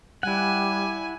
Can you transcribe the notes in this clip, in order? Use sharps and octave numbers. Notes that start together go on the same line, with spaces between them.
G3 E4 F#5 G#5